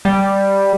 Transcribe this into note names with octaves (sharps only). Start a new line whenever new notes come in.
G3